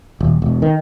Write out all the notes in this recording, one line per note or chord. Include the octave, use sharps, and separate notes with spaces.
D#1
E1
D#3